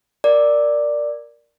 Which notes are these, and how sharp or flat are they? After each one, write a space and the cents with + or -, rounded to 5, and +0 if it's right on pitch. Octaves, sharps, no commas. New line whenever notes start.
A#4 +5 D5 +0